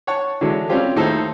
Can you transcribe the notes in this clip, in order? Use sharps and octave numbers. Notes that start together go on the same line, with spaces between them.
C#5 F#5 A5 C#6
D3 E3 F#3 G#3
G3 C4 C#4 F4 G4
D#2 A2 D#4 A4 C5